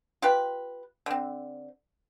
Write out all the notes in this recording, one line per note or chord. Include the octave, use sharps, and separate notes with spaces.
F4 G4 B4
D3 C4